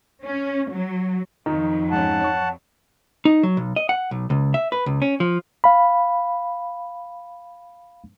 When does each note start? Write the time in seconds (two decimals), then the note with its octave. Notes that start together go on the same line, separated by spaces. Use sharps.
0.24 C#4
0.70 F#3
1.46 F2 D#3 F#3 D#4
1.91 G#2 C#4 F#5 A5
2.21 C#5 C#6
3.25 D#4
3.43 F#3
3.57 B1
3.76 D#5
3.89 F#5
4.11 B1
4.30 C#2
4.54 E5
4.72 B4
4.86 C#2
5.02 C#4
5.20 F3
5.64 F5 B5